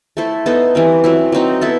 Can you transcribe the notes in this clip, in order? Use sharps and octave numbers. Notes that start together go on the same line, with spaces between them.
A3 E4 A4 C5
B3 D#4 A4 C5
E3 G3 C4
F#3 C4 E4
F#3 C4 D#4
B3 E4 A4